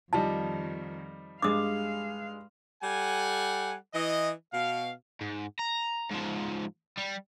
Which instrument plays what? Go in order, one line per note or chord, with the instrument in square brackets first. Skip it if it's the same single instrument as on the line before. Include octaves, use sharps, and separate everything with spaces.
[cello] F2 D#3 [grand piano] F3 G3 D#4 [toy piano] A5
[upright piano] G2 G#3 [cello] F5 [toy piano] D6 D#6
[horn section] G3 A4 F#5 G#5
E3 D#5
B2 F5
[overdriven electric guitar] G#2
A#5
G#2 F3
G3